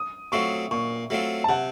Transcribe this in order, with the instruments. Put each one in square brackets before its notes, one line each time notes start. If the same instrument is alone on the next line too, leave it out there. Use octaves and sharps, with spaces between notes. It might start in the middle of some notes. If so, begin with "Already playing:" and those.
Already playing: [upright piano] D#6
[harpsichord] F#3 A3 C4 F4 [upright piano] C#6
[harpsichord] A#2 [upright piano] C#6
[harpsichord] F#3 A3 C4 F4
[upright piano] A5
[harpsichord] C3 [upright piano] F#5